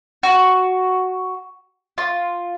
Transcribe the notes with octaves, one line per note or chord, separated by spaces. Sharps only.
F#4
F4